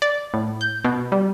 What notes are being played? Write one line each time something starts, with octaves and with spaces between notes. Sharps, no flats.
D5
A2
G6
B2
G3